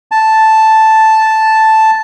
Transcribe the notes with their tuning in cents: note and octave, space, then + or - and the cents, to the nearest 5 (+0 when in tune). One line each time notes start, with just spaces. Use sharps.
A5 +0